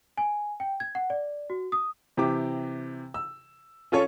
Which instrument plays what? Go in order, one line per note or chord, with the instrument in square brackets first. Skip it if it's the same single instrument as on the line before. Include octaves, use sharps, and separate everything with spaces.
[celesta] G#5
G5
G#6
F#5
D5
F#4
D#6
[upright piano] C3 E3 G4 D6
E6
C#4 F4 A4 C#5